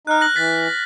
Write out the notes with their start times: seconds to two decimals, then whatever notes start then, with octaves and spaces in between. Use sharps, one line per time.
0.07 D#4 F6 F#6
0.21 F#6 A#6 F#7
0.36 E3 A6 B6